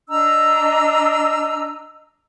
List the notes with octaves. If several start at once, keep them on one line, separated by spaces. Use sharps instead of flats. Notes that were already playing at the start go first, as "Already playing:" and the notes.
D4 D#5 A#5 E6